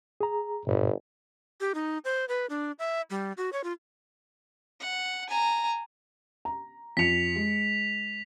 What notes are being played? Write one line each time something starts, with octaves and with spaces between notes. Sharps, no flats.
G#4 A#5
G1 G2 A#2
G4
D#4
C5
B4
D4
E5
G3
F#4
C#5
F4
F#5
G#5 A#5
A#5
F2 B6 C#7 F7
G#3